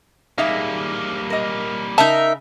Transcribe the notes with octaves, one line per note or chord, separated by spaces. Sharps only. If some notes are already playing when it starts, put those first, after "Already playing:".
G3 A#3 D#4 G#4 E5 F5
A#4 D#5
C#3 D#4 A#4 E5 A5